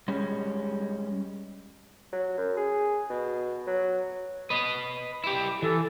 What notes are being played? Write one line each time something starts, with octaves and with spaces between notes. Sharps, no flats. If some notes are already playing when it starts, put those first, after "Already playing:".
G3 G#3 C#4
F#3
F#2
G#4
B2
F#3
B4 D#5
E4 G4
E3 A4